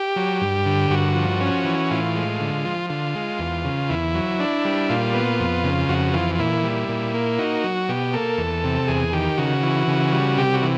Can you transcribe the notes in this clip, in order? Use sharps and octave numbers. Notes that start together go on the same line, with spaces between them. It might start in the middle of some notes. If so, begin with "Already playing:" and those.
Already playing: G4
F#3
G2
D3
G2 F#4
F3
C#4
E3
A2 F4
G#3
D3
F3
D3 F4
G#3
E2
C#3
E2 E4
F#3
D4
G3
A#2 F4
B3
F2
C#3
F2 F#4
E3 F4
F4
A#2 E4
G3
A#2
A#3
D#4 F#4
F#3
B2 G4
A#3 A4
E2
C3
E2 G#4
D#3 G4
C#3 F#4
E3
C#3
G3
C3 G4
F#4
E3